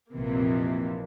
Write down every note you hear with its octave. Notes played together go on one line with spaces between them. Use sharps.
A#1 F2 C3 E3 A#3